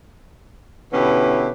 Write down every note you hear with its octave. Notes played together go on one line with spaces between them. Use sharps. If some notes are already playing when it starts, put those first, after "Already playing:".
B2 D3 E3 C#4 E4 G4